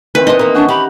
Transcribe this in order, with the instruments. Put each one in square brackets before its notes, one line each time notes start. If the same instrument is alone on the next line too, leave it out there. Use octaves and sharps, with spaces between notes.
[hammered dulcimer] D#3 E3 C4 [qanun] B4
[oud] B3 D4 [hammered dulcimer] C5 [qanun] D#5
[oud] A#3 B3 [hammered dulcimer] A#5
[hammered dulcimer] C#4 F#4 [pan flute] D4
[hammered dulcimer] F#4 [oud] G4 [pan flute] B5